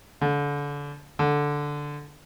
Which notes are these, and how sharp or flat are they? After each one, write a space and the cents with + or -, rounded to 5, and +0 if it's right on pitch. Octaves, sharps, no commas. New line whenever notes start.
D3 -30
D3 -5